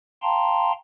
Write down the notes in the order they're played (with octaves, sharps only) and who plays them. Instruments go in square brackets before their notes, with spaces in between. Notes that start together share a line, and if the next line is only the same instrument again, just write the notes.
[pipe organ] F5 G5 A5 A#5 C6